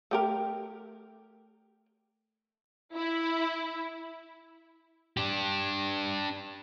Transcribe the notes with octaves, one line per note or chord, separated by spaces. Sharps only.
A3 G4 A#4
E4
D4 G4